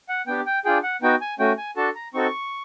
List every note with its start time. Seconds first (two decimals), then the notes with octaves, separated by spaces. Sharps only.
0.09 F#5
0.27 B3 D4 G4 G5
0.46 G5
0.65 D4 F4 G#4 G5
0.83 F#5
1.02 B3 D#4 F#4 G5
1.21 G#5
1.39 A3 C#4 F#4 G5
1.58 G#5
1.77 D4 F#4 A4 A5
1.95 A#5
2.14 C4 D#4 F#4 A4 C#6